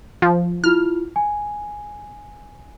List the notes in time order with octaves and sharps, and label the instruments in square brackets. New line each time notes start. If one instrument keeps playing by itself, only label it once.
[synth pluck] F3
[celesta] E4 F4 [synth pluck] F6
[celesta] G#5